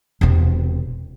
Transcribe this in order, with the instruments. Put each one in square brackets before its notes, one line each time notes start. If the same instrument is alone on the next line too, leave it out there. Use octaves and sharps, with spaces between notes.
[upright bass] E1 C3